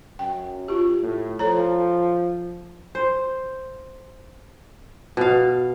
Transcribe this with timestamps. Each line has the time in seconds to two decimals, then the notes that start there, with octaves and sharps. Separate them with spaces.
0.19 F#2 G5
0.68 F4 G4
1.03 A2
1.39 F3 A4 C#5 A#5
2.95 C5
5.17 B2 F5